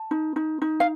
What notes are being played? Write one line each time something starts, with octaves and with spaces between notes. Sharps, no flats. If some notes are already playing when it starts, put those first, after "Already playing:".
Already playing: A5
D#4
D#4
D#4
F5